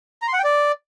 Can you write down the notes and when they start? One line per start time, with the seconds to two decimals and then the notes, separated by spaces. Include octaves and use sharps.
0.22 A#5
0.28 C6
0.33 F#5
0.39 G5
0.44 D5